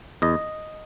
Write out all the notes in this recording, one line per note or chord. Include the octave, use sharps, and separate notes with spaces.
E2 D#5